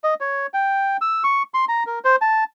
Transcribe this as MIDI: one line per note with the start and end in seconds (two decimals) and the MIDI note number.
0.04 0.14 75
0.20 0.47 73
0.54 0.97 79
1.01 1.23 88
1.24 1.43 85
1.54 1.65 84
1.68 1.84 82
1.87 1.99 70
2.05 2.16 72
2.21 2.44 81